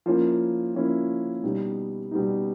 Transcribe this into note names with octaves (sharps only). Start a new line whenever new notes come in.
F3 A#3 C#4 E4
F3 A#3 C#4 E4
B2 G3 B3 D#4
B2 G3 B3 D#4